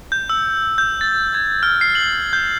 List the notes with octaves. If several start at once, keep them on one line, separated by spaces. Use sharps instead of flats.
G6
E6
G6
A6
G#6
F6
C7
F#7
G6